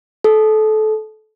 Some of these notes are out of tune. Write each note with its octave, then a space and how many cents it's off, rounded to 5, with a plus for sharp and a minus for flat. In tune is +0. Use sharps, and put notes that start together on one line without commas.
A4 -25